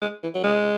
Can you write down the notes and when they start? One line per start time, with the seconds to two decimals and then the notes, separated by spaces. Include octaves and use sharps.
0.02 G#3
0.23 E3
0.34 F#3
0.44 G#3